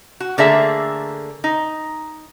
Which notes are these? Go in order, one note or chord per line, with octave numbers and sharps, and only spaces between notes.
F#4
D3 A3 A#3 G#4 A4 E5
D#4